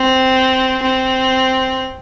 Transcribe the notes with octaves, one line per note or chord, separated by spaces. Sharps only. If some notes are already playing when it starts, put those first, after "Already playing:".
Already playing: C4
C4